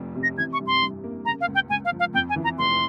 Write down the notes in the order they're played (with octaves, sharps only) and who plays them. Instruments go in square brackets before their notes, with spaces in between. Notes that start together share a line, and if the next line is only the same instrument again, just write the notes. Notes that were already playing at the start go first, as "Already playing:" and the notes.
Already playing: [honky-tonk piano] F1 F2 F3
C3
[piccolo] A#6
[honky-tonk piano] E3 [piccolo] G#6
[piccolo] C#6
[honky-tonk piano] G2
[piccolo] C6
[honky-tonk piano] G2
A#3
[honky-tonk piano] C#3 [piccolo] A#5
[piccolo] F5
[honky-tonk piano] C#2
[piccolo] G5
[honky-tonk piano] C#2 [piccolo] G#5
[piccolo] F5
[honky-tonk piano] F3
[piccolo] F5
[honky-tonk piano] F2 [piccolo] G5
[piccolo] G#5
[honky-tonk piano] E3
[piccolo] A#5
[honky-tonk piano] F1 [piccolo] C6